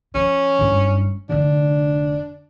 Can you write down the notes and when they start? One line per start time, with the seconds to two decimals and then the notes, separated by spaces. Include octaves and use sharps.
0.15 F3 C#4
0.59 F#1 G2
1.29 F1 D3 D4